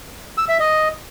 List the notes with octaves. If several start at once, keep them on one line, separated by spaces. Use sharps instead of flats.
E6
E5
D#5